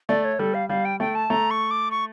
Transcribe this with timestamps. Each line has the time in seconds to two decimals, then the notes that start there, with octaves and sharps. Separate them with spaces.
0.09 A3 D5
0.25 C#5
0.39 G3 A4
0.54 F5
0.69 G3 F5
0.85 G5
1.00 A3 G5
1.15 A5
1.30 A3 A#5
1.51 C#6
1.71 D6
1.91 C#6